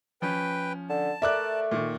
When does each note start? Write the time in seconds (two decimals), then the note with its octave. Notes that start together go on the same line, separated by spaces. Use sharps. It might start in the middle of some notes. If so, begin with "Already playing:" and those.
0.22 F3 C#4 B4 G5
0.90 D3 A5
1.22 A3 A#4 D5 E5 D6 F#6
1.71 A#2 D#3 C#6